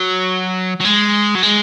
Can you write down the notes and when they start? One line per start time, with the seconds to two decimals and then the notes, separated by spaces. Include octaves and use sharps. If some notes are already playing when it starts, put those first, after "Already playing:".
Already playing: F#3
0.81 F#3
0.85 G#3
1.35 F#3
1.43 G#3